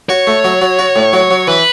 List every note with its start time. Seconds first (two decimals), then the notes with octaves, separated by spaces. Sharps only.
0.09 F#4 C#5
0.27 A3
0.44 F#3
0.62 F#3
0.79 F#4
0.96 A2
1.13 F#3
1.31 F#3
1.47 E3 B4